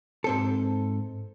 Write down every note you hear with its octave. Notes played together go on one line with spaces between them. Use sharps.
G#2 C4 A4